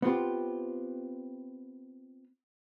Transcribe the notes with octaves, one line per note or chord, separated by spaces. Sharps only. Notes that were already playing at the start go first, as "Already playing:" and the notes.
B3 C4 F4 G4